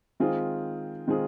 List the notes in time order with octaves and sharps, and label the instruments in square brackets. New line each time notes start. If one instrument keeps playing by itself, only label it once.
[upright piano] D#3 G#3 C4 F4 G#4
D#3 G#3 C4 F4 G#4